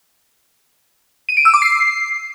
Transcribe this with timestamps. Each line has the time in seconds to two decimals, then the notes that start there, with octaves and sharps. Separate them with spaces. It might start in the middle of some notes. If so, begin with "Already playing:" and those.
1.29 D#7
1.37 D7
1.45 E6
1.54 D6
1.62 C7